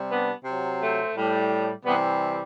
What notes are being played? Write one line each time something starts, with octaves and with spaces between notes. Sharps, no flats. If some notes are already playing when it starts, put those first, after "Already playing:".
Already playing: C3 G3
B3 D4
C3 F#3
A3 C4
A2 G3
C3 E3 G3 B3